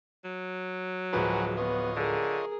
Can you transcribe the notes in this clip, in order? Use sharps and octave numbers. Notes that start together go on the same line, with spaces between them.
F#3
D1 F3 G#3 F#4 G#4 A#4 B4
B3 F4 C#5 D#5
D3 G#4 A#4